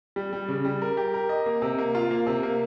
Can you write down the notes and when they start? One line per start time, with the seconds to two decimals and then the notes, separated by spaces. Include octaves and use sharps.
0.16 G3
0.33 G3
0.48 C#3
0.65 G3
0.82 A#4
0.97 G4
1.14 A#4
1.29 D#5
1.46 A#3
1.62 C3
1.78 A#3
1.95 F4
2.11 A#3
2.27 C3
2.43 A#3